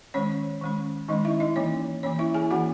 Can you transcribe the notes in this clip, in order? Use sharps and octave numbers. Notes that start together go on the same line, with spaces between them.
D#3 G#3 C#4 C#5
D#3 G#3 C#4
D#3 G#3 C#4 D#4 D#5
E4 E5
D#4 D#5
E3 A#3 C#4 C#5
E3 A#3 C#4 C#5
E4 E5
G#4 G#5
E3 A#3 C#4 F#4 F#5